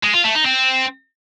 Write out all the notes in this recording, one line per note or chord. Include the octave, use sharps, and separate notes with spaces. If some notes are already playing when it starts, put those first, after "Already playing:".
G#3
F4
A3
D#4
C4